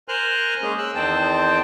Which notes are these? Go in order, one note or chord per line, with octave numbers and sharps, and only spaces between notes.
A#4 C5 G#5 C6 F6 F#6
G#3 A#3 C#4 G#4
E6 F#6
E2 D#3 C4 C5 G5 A5